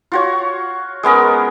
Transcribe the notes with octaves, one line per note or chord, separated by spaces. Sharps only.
F4 F#4 C#5
G#3 B3 C#4 A#4